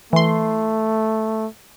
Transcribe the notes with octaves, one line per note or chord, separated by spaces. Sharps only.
E3 A3 C6